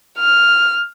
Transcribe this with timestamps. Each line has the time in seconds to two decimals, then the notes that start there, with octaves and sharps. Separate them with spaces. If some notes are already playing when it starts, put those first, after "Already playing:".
0.18 F6